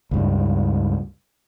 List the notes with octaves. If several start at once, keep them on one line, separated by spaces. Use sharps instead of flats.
C#2 G2